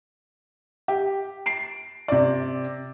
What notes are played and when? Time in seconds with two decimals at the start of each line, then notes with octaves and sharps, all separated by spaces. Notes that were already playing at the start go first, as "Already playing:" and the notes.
0.88 G4
1.46 C7 D7
2.08 C3 D5